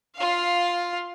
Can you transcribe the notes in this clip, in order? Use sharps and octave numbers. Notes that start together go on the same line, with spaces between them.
F4 F5